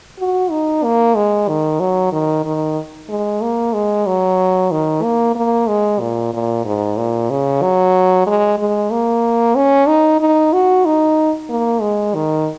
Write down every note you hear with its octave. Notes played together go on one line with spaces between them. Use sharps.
F#4
D#4
A#3
G#3
D#3
F#3
D#3
D#3
G#3
A#3
G#3
F#3
D#3
A#3
A#3
G#3
A#2
A#2
G#2
A#2
C#3
F#3
G#3
G#3
A#3
C#4
D#4
D#4
F#4
D#4
A#3
G#3
D#3